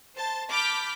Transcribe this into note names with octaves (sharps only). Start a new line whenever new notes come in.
C5 A5
A5 B5 D6 F6 G6 B6